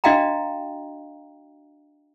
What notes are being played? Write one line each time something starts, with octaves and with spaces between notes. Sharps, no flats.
D4 F#4 D#5 F5 G5 A#5